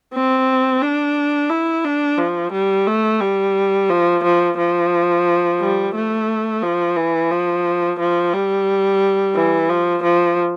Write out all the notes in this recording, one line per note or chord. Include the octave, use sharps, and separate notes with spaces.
C4
D4
E4
D4
F3
G3
A3
G3
F3
F3
F3
G3
A3
F3
E3
F3
F3
G3
E3
F3
F3